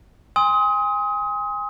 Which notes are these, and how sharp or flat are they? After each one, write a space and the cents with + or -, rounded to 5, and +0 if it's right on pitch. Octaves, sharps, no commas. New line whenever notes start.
G#5 -30 C6 +0 D#6 +30